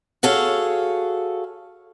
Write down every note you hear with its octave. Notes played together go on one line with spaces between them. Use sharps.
F#4 G#4 A4 C#5 F5